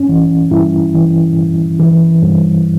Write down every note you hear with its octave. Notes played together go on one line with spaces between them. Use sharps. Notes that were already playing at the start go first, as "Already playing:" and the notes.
Already playing: G2 C#4
E3
G2 E4
E3
G2
E3
G2